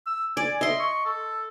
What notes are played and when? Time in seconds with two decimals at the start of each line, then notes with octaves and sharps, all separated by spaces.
0.06 E6
0.37 D5 G#5
0.61 D#5 E5 C6
0.79 C#6
1.05 A4